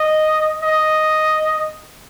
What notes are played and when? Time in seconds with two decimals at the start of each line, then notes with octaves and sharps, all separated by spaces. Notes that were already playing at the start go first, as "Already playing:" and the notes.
Already playing: D#5
0.63 D#5